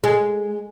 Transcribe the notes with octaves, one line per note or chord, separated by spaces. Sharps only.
G#3